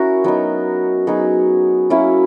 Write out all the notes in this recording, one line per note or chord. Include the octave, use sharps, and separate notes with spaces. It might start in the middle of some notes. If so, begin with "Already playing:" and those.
Already playing: C#4 E4 F#4 A#4
F#3 B3 D#4
F#3 B3 D#4 G#4
F#3 A#3 C#4 E4